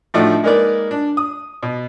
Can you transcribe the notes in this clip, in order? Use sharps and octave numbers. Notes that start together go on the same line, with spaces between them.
A2 F3 A3 D4 D#4 F#4
G#3 A#3 D#4 A#4 B4 D5
D4
D#6
B2